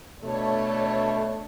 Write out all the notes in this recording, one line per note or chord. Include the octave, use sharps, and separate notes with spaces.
B2 A3 D4 A4 C#5